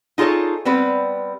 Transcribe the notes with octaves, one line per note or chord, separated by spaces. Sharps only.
D#4 F4 G#4 A4 C#5
G3 B3 C4 B4